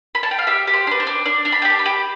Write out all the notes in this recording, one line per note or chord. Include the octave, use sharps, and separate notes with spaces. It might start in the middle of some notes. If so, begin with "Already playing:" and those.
B5
A5
G5
F5
G4 E5
G4
C5
D4 B4
C5
D4
D4 D5
D4
B5
G5
G4
A5
B5
G4